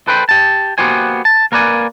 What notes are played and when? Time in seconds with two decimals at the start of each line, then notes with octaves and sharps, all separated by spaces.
0.08 A4 B4 C5 G5 A5 B5
0.29 G4 A5
0.78 A#3 B3 F#4 G4 C5 G#5
1.25 A5
1.52 A#3 A#4 B4 D5 G#5